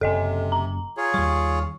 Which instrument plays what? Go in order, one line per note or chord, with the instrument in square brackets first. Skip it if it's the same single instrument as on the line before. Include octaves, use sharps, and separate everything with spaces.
[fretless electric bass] F#1 [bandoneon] C3 [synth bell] A4 D#5 G#5
[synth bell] A#5
[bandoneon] F4 G#4 C#5
[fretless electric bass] D#2 G3 [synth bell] C#6